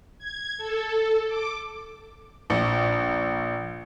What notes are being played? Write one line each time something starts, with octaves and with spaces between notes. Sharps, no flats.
G#6
A4
D6
A#1